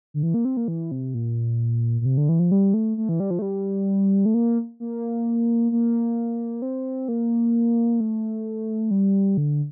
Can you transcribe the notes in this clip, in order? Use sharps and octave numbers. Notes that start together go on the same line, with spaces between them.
D3
E3
A#3
C4
A#3
E3
C3
A#2
A#2
C3
D3
E3
F3
G3
A3
A3
E3
G3
F3
A3
G3
A3
A#3
A#3
A#3
C4
A#3
A3
G3
D3